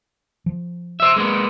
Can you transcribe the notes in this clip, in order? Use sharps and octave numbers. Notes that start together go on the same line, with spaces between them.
F3
C5 E5
G#3 A#3 B3